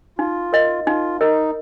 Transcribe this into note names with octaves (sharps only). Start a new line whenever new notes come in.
D#4 F4
A#4 D#5
D#4 F4
D#4 A#4 D#5